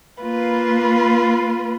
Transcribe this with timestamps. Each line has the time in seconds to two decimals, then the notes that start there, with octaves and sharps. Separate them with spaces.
0.20 A#3 F4 B4